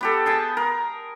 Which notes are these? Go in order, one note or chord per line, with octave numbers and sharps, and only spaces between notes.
B3 G4 A4
G#4 G5 A5
A#4